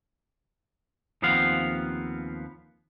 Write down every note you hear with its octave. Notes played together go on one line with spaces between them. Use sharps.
D#2 F3 B3 C4 F5 F#5